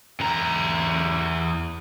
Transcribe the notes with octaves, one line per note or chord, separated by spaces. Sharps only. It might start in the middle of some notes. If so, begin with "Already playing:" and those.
E2 A#5